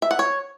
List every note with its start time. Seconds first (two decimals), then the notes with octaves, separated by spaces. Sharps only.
0.02 E5
0.11 F#5
0.19 C#5